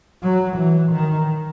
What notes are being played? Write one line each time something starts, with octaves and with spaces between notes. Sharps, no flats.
F#3
E3
D#3